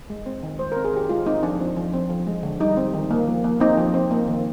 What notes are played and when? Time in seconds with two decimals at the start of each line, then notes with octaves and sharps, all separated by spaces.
0.10 G#3
0.26 C4
0.43 D#3
0.59 G#3 C5
0.72 A#4
0.76 C4
0.85 G#4
0.93 D#3 G4
1.09 G#3 F4
1.26 C4 D#4
1.43 F3 D4
1.60 C4
1.76 F3
1.94 C4
2.10 F3
2.27 G#3
2.43 D3
2.60 G3 D#4
2.77 C4
2.94 D#3
3.11 A#3
3.27 F3
3.44 A#3
3.60 C4 D#4
3.78 F3
3.94 C4
4.11 A#3
4.28 D#3